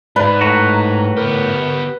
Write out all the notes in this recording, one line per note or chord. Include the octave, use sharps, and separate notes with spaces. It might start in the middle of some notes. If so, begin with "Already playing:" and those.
G#2 B4 D5
A2 F#4 A#5
B3 G4 A#4